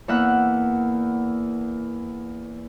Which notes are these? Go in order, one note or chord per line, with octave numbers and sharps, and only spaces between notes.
E2 A#3 E5 F#5 E6 F#6